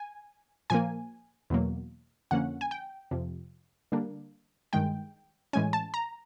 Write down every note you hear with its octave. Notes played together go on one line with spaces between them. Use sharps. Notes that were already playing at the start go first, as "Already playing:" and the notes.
Already playing: G#5
A#2 F3 A#3 G#5
E2 B2 F#3 A#3
F2 D3 F3 A#3 C#4 F#5
G#5
G5
F2 C3 F3
D3 G3 A#3 D4
G2 D#3 G#3 G5
A2 E3 G#3 C#4 G#5
A5
A#5